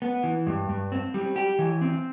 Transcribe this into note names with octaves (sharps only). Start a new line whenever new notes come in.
B3
E3
G2
G2
C4
G3
G4
E3
C4